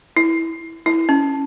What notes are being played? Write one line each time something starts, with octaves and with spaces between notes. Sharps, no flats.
E4
E4
C#4